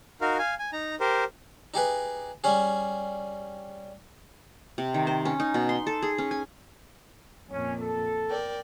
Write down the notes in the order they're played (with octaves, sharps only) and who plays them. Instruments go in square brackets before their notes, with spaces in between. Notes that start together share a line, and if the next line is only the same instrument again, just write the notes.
[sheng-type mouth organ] D#4 F#4 A#4 F5
F5 G#5
G#5
D#4 A#5
G4 A#4 C5
[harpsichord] D#4 G4 G#4 B4
G3 C#4 G#4
[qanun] C3
D#3
C5
C#4
D#4
B2
C6
A4
G#4
C#4
G#5
[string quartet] F2 A#2 [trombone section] C#4
[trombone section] A4
[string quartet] A#4 D5 G5